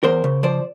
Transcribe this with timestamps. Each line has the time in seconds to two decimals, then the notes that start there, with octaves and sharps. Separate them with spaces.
0.03 E2 A#4 C5
0.24 C#3
0.43 F3 C5 D5